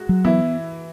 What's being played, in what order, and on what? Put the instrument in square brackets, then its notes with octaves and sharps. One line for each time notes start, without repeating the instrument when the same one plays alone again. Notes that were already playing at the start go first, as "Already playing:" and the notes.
Already playing: [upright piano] G#3 F#4
[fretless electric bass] F#3
[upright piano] E3 E4 [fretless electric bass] B3